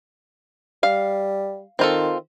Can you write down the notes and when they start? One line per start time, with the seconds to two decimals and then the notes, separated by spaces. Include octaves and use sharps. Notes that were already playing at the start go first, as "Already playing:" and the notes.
0.83 G3 F5
1.79 D#3 C4 F4 A4